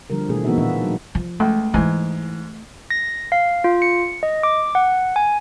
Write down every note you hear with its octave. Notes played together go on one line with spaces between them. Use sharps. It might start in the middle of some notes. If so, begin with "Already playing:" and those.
D3 F3 G3 A#4
B2 E3 A3 G#4
E3 A#3 B3 D#4 F#4 E5
A#2 D#3 F3 D4 E5
F#3
F3
C#2 A3
G#2 E3 E4 G#5
A#6
F5
F4
C#7
D#5
D6
F#5
G#5